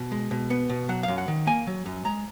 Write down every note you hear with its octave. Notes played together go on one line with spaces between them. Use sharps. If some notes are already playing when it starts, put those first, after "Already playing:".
Already playing: B2
G#3
B2
B3
B2
F#3 F#5
F#2 F5
F#5
D#3
A#3 G#5
F#3
F#2
G#3 A#5